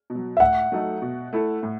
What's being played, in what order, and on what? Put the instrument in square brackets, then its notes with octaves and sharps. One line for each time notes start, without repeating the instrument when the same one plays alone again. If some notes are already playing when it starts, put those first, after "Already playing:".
[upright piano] B2
F#3
[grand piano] E5
[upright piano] A2 [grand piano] F#5
[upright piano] F#3 A3 D#4 A4
B2
A3 E4 A4
A2